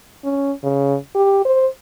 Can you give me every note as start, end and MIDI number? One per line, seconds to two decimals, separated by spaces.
0.24 0.52 61
0.63 0.97 49
1.15 1.41 67
1.45 1.67 72